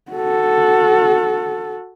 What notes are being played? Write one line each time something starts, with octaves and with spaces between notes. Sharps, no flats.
F#4 A4